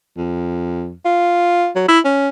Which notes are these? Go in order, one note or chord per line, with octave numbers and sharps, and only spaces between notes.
F2
F4
F#3
E4
C#4